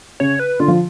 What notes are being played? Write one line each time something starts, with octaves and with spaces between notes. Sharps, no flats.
C#3 C#5
B4
D3 F4
F3